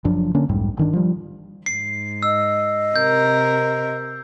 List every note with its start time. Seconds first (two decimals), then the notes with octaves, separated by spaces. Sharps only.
0.05 F#1 F#2 F3 D4
0.34 D3 A#3 C#4 D4
0.49 B1 F2 G#2 G3
0.77 G1 D#3 D4
0.93 F3 G3
1.66 G#2 C7
2.23 D#5 E6
2.96 C3 A#4 G6